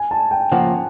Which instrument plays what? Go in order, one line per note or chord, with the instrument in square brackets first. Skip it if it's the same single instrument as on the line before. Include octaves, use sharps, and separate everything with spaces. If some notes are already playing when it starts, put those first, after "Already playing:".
Already playing: [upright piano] G#5
A5
G5
[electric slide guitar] C#3 F3 A#3 [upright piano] F#5